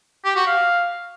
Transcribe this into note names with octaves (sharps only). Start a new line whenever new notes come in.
G4
F#4
F5